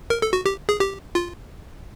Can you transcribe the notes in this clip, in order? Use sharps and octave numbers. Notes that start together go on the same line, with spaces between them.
A#4
A4
F#4
G4
G#4
G4
F4